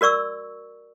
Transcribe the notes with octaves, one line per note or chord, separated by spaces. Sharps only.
F#4 A#4 D5 C#6 E6